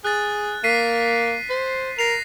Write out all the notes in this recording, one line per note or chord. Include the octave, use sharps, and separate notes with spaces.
G#4 F#6 A6
A#3 B6 C7 D#7
C5
A#4 A#6 C7 F7